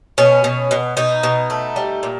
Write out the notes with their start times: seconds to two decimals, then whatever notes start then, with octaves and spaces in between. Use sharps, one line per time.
0.18 B2 C#4
0.44 B2
0.71 B2
0.97 B2 D#4
1.23 B2
1.50 A3
1.76 G3
2.03 A#2